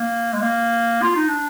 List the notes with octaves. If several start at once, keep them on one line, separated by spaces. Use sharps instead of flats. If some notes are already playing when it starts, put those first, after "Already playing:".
Already playing: A#3
G#3
A#3
F4
D#4
D4